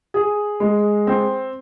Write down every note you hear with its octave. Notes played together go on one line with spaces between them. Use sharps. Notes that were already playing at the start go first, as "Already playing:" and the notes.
G#4
G#3
C4